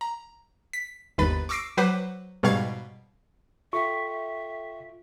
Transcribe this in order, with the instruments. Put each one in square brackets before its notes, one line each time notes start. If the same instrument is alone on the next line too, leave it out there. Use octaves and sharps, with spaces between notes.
[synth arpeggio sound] A#5
B6
G1 D#2 B4 B5 A6
C#6 D6 E6 A#6 C7 D7
F#3 B4 C5 F#5 D6
G#2 B2 G3 F5 C#6 G#6
[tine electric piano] F4 [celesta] A4 G5 [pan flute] E5 [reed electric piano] C#6